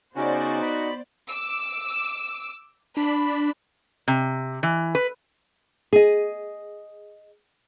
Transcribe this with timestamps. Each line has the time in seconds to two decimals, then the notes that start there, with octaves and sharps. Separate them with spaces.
0.16 C#3 B3 C#4 D#4 F#4 C5 D5
0.62 B5
1.28 D6 E6
2.97 D4 B5
4.08 C3
4.63 E3
4.95 B4
5.93 G#4 D#5